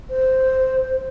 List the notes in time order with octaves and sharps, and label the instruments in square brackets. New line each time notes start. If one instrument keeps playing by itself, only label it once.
[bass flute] C5